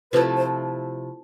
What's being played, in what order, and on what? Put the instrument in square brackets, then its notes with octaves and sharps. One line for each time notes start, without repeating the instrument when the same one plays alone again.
[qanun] C3 F3 A3 E4 [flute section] B4
[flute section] C5